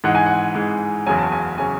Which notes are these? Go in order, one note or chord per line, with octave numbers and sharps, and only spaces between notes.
G#2 E3 G#3 F#5
G#5
F#5
G#2 E3 G#3
F#1 E2 C#3 F#3 C#4 G#5
A5
G#5
C#3 F#3 C#4 G#5